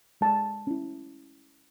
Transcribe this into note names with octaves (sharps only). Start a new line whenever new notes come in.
G#3 A5
C#4 E4